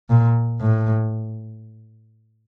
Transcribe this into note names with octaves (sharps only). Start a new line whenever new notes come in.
A#2
A2